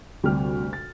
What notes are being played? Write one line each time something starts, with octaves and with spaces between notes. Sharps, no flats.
D2 C3 G3 G4 F6
A6